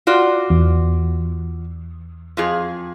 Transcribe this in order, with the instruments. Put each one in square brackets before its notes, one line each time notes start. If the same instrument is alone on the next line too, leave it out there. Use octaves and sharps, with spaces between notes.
[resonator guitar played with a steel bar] F4 F#4 D5
[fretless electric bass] E2
[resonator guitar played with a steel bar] F2 F3 G#4